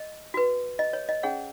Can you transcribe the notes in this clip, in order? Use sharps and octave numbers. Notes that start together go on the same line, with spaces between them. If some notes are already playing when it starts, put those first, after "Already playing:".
Already playing: D#5
F#4 B4
D#5
C#5
D#5
C#4 G#4 C#5 F#5